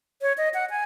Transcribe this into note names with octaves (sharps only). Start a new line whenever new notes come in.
C#5
D#5
F#5
G#5